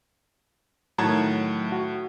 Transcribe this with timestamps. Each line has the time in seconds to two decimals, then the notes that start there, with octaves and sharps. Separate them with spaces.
0.98 A2 D#3 F#3 F#5 A5 G#6
1.72 F#4